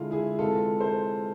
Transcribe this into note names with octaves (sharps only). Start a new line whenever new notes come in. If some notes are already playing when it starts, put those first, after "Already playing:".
Already playing: D3 G#3 E4 F4
E4 G#4
C3 E3 G#3 F4 A4
A4 C5